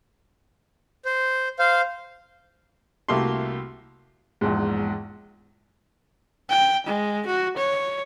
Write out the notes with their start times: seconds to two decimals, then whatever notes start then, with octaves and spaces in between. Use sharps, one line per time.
1.05 C5
1.59 C5 F5
3.08 C2 A3 A#3 F#4 G4 C6
4.41 A#1 E2 G#2
6.50 G5
6.87 G#3
7.27 F#4
7.57 C#5